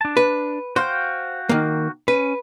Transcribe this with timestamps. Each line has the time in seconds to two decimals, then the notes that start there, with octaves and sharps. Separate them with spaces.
0.01 D4 A5
0.17 B4
0.76 F#4 C5 F5 G5
1.49 D#3 A#3
2.08 C#4 B4